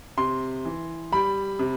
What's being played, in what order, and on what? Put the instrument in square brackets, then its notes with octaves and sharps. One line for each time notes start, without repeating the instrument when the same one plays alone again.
[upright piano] C3 C6
E3
G3 B5
C3